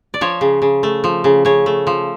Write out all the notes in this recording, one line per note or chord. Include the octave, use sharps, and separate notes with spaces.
D5
F3 C#5
C#3
C#3
A3
F3
C#3
C#3 C#5
A3
F3